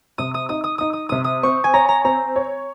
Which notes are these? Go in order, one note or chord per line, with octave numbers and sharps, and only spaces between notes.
C3 D#6
D#6
D#4 D#6
D#6
D#4 D#6
D#6
C3 D#6
D#6
C4 C#6
G#5
C#5 A#5
A#5
C4 A#5
C#5